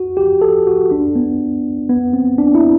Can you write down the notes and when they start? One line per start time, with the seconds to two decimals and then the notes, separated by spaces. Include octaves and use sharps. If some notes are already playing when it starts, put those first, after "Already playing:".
Already playing: F#4
0.17 G4
0.42 A4
0.67 F#4
0.91 D4
1.16 B3
1.89 B3
2.13 C4
2.38 D4
2.55 E4